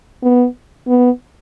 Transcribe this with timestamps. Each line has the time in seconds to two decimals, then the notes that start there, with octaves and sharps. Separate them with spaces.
0.23 B3
0.87 B3